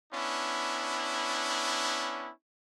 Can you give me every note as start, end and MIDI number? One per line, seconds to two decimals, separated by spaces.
0.13 2.31 59
0.13 2.31 61
0.13 2.31 62
0.13 2.31 64